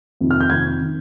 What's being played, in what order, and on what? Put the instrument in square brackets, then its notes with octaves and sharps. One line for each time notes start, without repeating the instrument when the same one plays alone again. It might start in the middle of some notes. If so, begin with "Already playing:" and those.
[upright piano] F2 C3 D#3
F6
G6
F2 C3 D#3 G#6
D#3